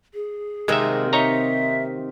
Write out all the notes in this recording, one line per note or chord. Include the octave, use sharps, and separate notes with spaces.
G#4
C3 D#3 G#3 A#3 E5
D#4 C#5 E5 A#5